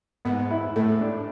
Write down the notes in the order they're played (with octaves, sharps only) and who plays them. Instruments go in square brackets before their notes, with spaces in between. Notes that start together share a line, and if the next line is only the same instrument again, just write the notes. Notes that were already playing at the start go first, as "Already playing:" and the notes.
[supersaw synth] G#2 [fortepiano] B3
[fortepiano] E4
[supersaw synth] A2 [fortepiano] A3
[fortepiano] D4